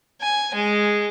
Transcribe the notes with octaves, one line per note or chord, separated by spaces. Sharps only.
G#5
G#3